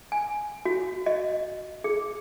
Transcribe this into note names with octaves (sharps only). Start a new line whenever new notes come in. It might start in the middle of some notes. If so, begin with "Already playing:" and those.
G#5
F#4
D#5
G#4